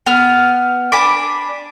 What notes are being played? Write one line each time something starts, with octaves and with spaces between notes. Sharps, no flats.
B3 F6
D4 G#5 B5 D6